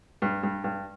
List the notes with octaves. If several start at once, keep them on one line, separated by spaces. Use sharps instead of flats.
G2
G2
G2